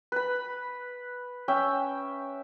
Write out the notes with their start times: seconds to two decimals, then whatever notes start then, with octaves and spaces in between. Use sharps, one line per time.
0.12 B4 B5
1.48 C#4 E5 G5